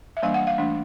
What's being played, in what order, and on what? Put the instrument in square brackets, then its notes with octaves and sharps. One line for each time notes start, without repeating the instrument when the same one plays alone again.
[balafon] E5
E3 G3 A#3 D4 F5
F#5
F5
E3 A3 D4